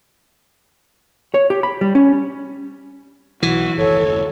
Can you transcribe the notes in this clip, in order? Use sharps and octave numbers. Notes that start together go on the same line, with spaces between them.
C#5
G4
B5
G3
C#4
B1 E3 F#4
F#1 D#2 A4 C#5